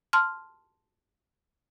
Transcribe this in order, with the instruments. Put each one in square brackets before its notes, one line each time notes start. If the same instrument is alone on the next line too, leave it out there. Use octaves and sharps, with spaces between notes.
[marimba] A5 C6 F6